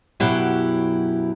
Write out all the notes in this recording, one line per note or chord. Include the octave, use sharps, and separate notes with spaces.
F#2 B2 F#3 E4 G4